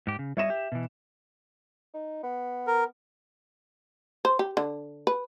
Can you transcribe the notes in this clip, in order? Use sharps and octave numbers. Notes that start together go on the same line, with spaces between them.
G#2 G4
C#3
G3 C#5 D#5 E5 E7
G4
B2 E3
D#4
B3
A#4
C5
G4
D3
B4